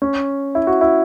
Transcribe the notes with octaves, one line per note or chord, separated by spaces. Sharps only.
C#4
E4
F#4
E4